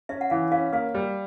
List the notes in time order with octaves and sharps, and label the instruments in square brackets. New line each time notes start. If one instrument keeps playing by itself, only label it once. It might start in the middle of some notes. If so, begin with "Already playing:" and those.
[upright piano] C#4 [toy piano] E5
[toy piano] F#5
[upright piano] E3 [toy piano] F5
[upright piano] C#4 [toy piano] F5
[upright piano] A#3 [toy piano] F5
[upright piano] G3